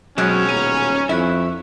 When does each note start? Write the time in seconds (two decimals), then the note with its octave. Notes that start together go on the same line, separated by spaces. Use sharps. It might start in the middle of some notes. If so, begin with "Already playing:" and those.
0.18 B2 F#3 G#3 C4 C#4 C#5
0.49 D#1 G#5 A#5
1.09 F2 E4 E5 C#6 F#6